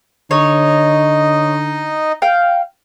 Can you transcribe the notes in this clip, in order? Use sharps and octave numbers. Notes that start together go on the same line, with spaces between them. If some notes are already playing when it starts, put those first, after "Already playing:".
D3 D#4 C#5 D#5
F5 G5